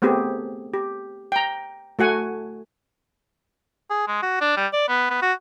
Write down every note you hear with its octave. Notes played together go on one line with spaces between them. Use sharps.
A3 B3 C4 G4 G#4
G4
G5 A#5
A3 F#4 F#5 G#5
G#4
G#3
F#4
D4
G3
D5
B3
B3
F#4